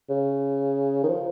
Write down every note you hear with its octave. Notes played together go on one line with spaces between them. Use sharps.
C#3
D#3
F3